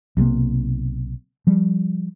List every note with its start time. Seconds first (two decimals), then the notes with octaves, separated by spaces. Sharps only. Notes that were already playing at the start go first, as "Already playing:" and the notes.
0.17 B1 C3 F#3 A#3
1.47 F3 G3